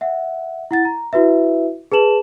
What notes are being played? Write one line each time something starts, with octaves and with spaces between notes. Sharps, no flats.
E5 F#5
E4 F#5 A6
A#5
E4 F#4 B4 E5
G#4 B4 A5 E7 F#7